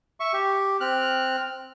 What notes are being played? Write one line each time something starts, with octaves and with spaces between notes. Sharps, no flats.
E5 C#6
G4
C4 F6 F#6